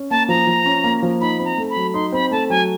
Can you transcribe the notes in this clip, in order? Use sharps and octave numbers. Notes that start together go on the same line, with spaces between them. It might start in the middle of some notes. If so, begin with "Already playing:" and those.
Already playing: C#4
A#3 A5
F3 A#5
F3
C#4
A#3
F3
D#4 B5
C4
A#5
A3
B5
F#3
D#4 C6
C4 B5
A3 A5
F#3 G#5